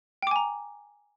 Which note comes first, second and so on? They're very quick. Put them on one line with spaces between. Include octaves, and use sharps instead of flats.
G5 D6 G#5 A#5